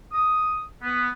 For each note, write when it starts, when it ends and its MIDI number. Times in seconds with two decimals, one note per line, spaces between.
0.12 0.62 87
0.82 1.10 59